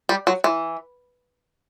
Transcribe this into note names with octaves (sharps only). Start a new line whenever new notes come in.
G3
F#3
E3